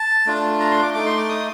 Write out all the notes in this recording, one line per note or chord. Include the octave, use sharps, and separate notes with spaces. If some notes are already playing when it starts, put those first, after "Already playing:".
Already playing: A5
A3 D4 F4
A#5
C6
D6
A3 D#4 D6
C6
D6
D#6